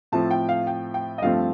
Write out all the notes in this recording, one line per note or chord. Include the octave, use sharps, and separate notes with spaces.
A2 F3 A3 C4 A5
G5
F5
G5
G5
D#5
G2 F3 A3 C4 F5